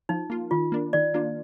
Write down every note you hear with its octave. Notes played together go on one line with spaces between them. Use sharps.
F3 D#4
A#3 F4
D#3 F4
A#3 D4
D#3 D5
A#3 D4 F4